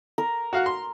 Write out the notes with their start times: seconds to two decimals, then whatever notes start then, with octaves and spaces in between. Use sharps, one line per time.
0.18 A#4
0.53 F#4 F5 F#5
0.66 C6